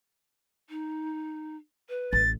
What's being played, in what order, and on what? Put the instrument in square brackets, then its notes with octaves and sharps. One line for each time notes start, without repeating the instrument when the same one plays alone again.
[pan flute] D#4
B4
[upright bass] A1 [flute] A6